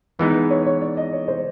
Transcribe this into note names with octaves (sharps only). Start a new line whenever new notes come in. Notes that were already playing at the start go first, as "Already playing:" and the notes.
E3 G#3 B3 D#4 B4
B4
C#5
C#5
D5
D#5
C#5
C5